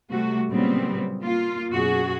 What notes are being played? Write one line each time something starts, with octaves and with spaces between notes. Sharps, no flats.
C3 G3 A3 F#4
A#2 C#3 F#3 G3 B3 C4
A#3 F4
F#2 B2 F#4 G#4